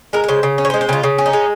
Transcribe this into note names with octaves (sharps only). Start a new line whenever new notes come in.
G#3 A#4
A#4
C#3 C5
C#3
C#4
C#5
C5
G#3
C5
C#3 F4
C#3
C#4
D#4
G#3